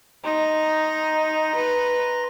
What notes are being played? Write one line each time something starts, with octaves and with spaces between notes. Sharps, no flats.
D#4 A#5 C6 A#6
B4